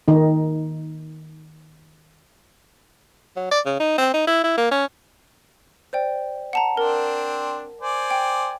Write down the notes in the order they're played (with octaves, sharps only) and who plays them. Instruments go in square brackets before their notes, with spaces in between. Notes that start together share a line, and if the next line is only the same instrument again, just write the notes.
[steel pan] D#3 D#4
[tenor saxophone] F#3
D5
C#3
D#4
C4
D#4
E4
E4
A#3
C#4
[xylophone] C5 D5 G5
F#5 A5 A#5
[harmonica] C4 D4 [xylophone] A#4
[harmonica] C5 D5 G#5
[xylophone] G5